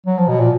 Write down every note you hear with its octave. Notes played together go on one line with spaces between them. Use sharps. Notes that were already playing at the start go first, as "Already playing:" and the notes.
F#3
F3
B2
A#2